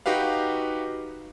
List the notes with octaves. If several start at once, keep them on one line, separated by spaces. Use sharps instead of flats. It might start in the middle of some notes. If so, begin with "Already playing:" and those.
D#4 F#4 G4 B4 F5